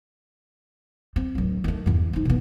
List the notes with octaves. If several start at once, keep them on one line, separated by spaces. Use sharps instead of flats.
C4
D1 F#3
D#3 A3
E2 G2
F3 D#4
B2 B3